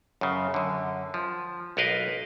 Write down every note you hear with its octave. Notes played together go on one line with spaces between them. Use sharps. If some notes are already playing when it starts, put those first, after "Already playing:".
F#2 C#3
F#2 D3
F3
B1 F#4 A#4 B4 D#5 F5